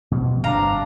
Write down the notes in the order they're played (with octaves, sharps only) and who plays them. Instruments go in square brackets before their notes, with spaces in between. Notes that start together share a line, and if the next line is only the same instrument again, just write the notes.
[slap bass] B2 F3 G3
[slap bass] G1 G2 C3 [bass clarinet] D4 [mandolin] F5 A#5